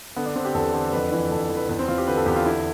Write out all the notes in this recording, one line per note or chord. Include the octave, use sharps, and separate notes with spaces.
D3 B3
D4
D3 C4
G4
E2 A4
D3 C5
F2 B4
E3 B4
F2 A4
A4
E3
B4
E2 B4
C4
E2 F4
G4
D3 B4
A4
E2 G4
F4
D3 E4